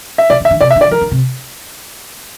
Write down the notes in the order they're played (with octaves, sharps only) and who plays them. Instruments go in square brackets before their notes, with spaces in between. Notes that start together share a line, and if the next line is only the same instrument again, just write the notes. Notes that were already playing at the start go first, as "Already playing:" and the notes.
[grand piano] E5
[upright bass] C3 [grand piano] D5
[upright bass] D3
[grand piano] E5
[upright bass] D3
[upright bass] C3 [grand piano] D5
[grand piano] E5
[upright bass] D3
[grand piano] D5
[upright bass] E3 [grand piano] A#4
[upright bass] D3
C3